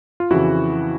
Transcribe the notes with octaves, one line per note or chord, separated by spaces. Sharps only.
F4
F2 C#3 E3 E4 F#4